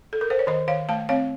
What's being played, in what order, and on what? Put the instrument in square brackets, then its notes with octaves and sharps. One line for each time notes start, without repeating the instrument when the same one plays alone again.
[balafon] A4
A#4
C5
C#5
D#3 C5 D#5
D#3 C#5 F5
A3 F5 A5
C4 C#5 F5